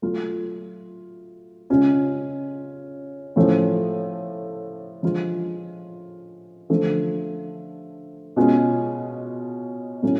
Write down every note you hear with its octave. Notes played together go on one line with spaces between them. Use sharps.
F#3 A3 F4
C#3 G#3 C#4 F4
A2 F3 A3 C#4
F3 G#3 D4 F4
D3 F3 A3
B2 G#3 C#4 F4
A2 F#3 C#4